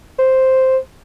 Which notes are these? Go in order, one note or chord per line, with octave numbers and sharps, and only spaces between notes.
C5